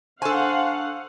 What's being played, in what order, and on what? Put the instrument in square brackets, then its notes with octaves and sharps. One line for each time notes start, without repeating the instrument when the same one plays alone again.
[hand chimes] D4 C#6 [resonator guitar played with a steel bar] A4 G#5 [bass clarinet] C5 [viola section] F5 F#5